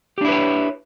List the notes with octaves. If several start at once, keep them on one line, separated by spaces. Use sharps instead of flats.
D4 E4 G4 B4 C#5